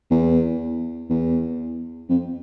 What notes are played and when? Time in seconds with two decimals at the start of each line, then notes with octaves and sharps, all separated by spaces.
0.11 E2
1.10 E2
2.09 F2